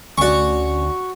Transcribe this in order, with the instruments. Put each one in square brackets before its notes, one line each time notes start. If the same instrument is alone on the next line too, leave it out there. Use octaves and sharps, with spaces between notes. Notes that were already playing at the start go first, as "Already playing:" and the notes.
[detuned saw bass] D2 [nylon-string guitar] C#4 D5 [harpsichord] F#4 C#6